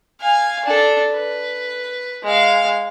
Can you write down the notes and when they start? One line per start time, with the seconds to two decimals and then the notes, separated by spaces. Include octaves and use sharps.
0.21 F5 G#5
0.66 D4 A4
1.14 B4
2.24 G#3 F5